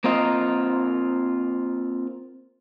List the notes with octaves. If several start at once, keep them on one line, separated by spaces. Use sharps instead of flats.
A#3 C4 F4 A#4 D#5